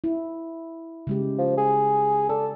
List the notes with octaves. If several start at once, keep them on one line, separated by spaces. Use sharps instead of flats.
E4
C#3 G#3 G4
F3
G#4
A4 D5